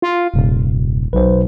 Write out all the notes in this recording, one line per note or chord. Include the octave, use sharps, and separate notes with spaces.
F4
D#1 F#2 C3
B1 B4 C5